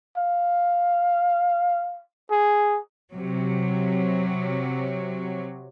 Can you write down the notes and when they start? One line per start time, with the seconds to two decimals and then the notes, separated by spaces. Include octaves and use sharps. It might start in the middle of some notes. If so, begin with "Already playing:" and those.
0.17 F5
2.30 G#4
3.14 C3 F#3